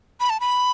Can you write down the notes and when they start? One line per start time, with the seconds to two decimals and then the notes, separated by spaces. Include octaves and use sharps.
0.20 B5
0.30 A5
0.40 B5